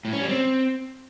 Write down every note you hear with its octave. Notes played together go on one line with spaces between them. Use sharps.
A2
C#4
G3
C4